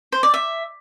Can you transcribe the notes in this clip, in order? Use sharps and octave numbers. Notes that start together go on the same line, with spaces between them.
C5
D5
E5